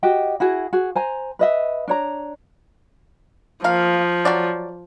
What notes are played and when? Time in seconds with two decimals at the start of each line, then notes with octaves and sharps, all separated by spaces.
0.03 F#4 G4 D#5 G5
0.40 E4 F#4 G#4
0.73 F#4 G#4
0.96 C5 G#5 A#5
1.39 B4 D#5 E5
1.88 D4 C#5 A#5
3.64 F3 A#3 F5
4.25 F#3 F#4 D5